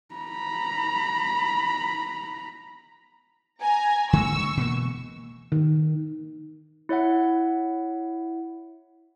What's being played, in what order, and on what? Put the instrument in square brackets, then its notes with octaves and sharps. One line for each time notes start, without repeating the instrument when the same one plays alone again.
[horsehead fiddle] A#5 B5
[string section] G#5 A#5
[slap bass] D3 G#3 A#3 [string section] C#6 E6
[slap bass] B2 E3 A#3
[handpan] D#3
[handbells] E4 C#5 E5 F#5